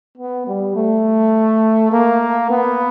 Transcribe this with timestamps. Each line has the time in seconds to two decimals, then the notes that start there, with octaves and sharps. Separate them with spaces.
0.17 B3
0.47 G3
0.76 A3
1.92 A#3
2.50 B3